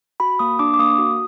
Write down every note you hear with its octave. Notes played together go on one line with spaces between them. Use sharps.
F#4 B5
A#3 D#6
D4 D6
D6
A#3 D#6
F#4